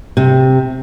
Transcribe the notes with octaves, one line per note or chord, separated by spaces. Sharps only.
C3